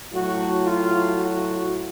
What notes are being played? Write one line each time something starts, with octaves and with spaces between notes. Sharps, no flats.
A2 F#3 A3 F#4
F4
F#4